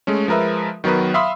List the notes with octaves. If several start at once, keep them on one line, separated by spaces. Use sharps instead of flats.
G#3 A3 C#4
F3 G#3 A#4 B4 E5
D#3 F#3 B3 A#4 B4
E5 F5 B5 C6 D#6 E6